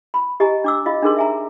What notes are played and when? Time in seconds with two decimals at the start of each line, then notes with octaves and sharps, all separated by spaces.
0.14 B5
0.40 G4 D#5 G#5 A#5
0.64 D4 D6 E6
0.86 F4 D#5 F5
1.02 D4 D#4 G#4 A#4 C6
1.17 E5 G#5 A#5